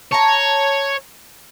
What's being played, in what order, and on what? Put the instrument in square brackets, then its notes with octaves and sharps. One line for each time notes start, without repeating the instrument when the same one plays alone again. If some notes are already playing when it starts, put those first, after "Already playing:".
[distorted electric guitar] C#5 [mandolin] A5 A#5